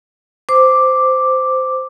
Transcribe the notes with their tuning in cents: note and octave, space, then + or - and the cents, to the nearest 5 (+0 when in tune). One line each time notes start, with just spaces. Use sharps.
C5 -15 D6 +0